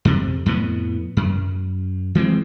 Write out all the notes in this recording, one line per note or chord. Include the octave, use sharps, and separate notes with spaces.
F2 C3
F2 A2 B3
F#2
E3 G#3 A3 C4